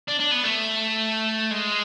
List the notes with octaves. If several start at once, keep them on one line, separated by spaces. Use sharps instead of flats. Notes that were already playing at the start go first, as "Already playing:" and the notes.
D4
D4
B3
A3
G#3